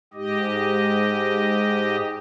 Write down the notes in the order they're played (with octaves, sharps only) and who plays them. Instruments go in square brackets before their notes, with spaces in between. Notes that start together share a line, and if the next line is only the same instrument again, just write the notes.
[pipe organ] G#2 G4 D#5